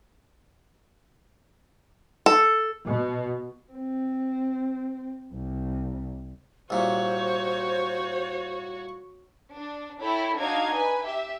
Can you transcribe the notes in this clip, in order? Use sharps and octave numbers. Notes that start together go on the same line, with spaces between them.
A4
B2
C4
C2
C2 A#2 F#4 C5 C#5
D4
E4 A4 C#5 G5 B5
D4 D#4 F#4 F5 G#6
B4 G#5
G4 E5